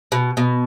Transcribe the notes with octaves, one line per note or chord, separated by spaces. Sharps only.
B2
B2